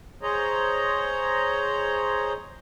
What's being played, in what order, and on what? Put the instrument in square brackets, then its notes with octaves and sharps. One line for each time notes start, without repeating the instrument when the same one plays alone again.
[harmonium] G#4 C5 C#5 D#5 A#5